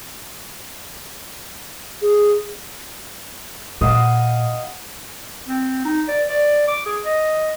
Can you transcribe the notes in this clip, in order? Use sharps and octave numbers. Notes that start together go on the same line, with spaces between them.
G#4
A#2 D#5 F5 F#5
C4
D#4
D5
D5
D6
G#4
D#5